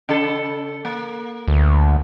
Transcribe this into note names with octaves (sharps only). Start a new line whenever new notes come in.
C#3 A4
A#3
D2